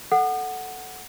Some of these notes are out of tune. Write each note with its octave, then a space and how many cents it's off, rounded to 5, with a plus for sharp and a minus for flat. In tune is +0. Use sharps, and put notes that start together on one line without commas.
A4 +0 F#5 +0